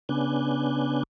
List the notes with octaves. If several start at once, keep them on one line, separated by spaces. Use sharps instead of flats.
C#3 B3 D4 G#5 F#6 G6